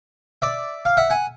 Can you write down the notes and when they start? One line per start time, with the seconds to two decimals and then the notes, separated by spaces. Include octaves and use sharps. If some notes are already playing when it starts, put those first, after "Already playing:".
0.42 D5 E5
0.85 F5
0.97 E5 F#5
1.10 F#5 G#5